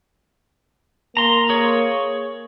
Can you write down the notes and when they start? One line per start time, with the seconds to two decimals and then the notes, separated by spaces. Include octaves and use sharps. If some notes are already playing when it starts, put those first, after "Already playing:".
1.17 A#3 A#5 C6
1.49 G#4 C#5